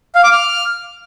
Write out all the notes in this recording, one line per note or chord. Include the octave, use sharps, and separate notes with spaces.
F5
D6
F6